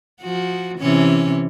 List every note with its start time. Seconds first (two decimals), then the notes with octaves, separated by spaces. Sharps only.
0.22 F3 F#4
0.78 C3 E3 C#4